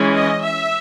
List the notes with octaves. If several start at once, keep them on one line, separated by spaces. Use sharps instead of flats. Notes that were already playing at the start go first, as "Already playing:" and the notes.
Already playing: E3 G#3 C#4
D#5
E5